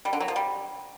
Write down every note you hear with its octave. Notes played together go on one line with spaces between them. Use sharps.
G3
D3
F#3
F3
G3